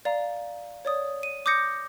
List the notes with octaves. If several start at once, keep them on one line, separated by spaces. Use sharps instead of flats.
D5 F5 A#5
C#5 D5 D#6
D#7
D6 D#6 G6 A#6 C#7